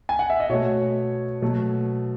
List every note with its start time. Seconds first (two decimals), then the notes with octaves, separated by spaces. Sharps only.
0.09 G#5
0.19 F#5
0.30 E5
0.40 D#5
0.49 B2 A3 C#5
1.42 B2 F#3 A3